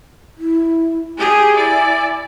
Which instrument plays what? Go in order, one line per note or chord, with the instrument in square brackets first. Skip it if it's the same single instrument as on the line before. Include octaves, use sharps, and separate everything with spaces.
[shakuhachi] E4
[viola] G4 G#4 [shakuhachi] G#5
[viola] E4 D5